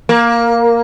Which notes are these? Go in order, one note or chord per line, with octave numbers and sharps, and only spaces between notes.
A#3